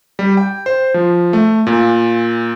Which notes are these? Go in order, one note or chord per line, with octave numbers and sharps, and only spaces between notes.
G3
G5
C5
F3
A3
A#2